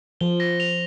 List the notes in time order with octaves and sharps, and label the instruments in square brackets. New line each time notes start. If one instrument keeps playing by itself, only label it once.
[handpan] F3 [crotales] G7
[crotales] A#6
F7